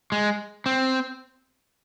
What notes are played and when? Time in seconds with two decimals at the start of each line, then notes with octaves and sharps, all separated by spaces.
0.12 G#3
0.66 C4